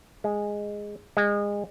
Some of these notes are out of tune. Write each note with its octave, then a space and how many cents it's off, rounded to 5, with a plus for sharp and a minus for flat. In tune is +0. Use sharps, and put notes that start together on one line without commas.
G#3 -5
G#3 -25